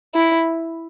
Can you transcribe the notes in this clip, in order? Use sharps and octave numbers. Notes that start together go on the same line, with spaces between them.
E4